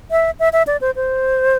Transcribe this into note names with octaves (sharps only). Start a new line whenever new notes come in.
E5
E5
E5
D5
C5
C5